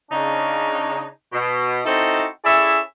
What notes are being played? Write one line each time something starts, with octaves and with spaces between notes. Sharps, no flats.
C#3 D4 D#4
B2
C4 D#4 E4 F#4 A4
C#4 E4 G#4 A4 D5 E5